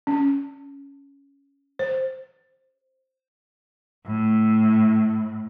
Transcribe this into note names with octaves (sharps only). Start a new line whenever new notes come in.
C#4
C5
A2